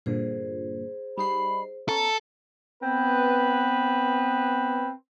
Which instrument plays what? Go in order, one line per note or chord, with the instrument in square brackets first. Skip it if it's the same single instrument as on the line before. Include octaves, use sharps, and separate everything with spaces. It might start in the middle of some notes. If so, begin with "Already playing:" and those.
[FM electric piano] G2 A#2 D3 [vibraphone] G#4 C5
[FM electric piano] G3 D#4 C7 [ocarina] B5
[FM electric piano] B3 C#4 [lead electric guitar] A4 [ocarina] A#5
[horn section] B3 C4 B4